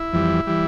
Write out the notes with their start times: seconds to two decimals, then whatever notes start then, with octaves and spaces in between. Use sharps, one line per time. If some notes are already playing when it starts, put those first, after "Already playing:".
Already playing: E4
0.13 F2 E3 G3
0.47 E3 G3